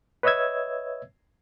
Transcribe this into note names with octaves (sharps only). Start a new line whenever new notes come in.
B4 C#5 D#5 E5 E6 G#6